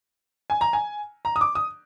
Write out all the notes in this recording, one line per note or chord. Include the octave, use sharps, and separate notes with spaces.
G#5
A#5
G#5
A#5
D#6
D6
D#6